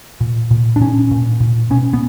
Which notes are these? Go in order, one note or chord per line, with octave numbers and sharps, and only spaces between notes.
A#2
A#2
D4
A#2 C#4
A#2
A#2
B2 C#4
B3